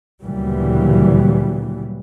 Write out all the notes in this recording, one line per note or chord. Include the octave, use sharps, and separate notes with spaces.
D2 A#2 C#3 E3 F#3 G3